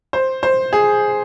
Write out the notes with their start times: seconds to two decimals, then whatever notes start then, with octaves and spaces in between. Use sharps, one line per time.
0.13 C5
0.43 C5
0.73 G#4